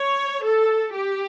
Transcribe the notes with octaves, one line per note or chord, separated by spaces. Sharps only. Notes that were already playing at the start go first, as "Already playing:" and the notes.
Already playing: C#5
A4
G4